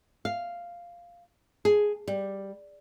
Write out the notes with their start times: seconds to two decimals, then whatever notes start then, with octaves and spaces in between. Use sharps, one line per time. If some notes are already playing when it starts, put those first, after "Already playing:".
0.25 F5
1.65 G#4
2.08 G3